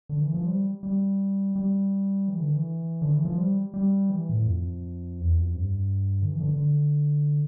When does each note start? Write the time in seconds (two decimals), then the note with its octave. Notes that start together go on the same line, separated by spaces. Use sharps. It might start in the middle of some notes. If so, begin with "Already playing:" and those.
0.09 D3
0.22 E3
0.34 F3
0.46 G3
0.83 G3
1.56 G3
2.28 E3
2.40 D3
2.52 E3
3.02 D3
3.13 E3
3.25 F3
3.38 G3
3.74 G3
4.10 E3
4.29 A2
4.46 F2
5.20 E2
5.37 F2
5.56 G2
6.22 D3
6.29 E3
6.40 D3
6.54 D3